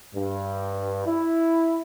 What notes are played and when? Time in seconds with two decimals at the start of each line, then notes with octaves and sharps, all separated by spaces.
0.16 G2
1.07 E4